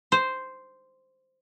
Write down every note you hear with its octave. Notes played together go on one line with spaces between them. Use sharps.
C5